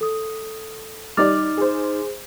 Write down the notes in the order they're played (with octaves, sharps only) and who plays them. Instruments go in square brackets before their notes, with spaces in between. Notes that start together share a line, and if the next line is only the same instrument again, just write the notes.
[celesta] A4 D#6
[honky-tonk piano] G3 D5 [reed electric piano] D#4 F6 [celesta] D6 A6
[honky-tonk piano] G#4 C5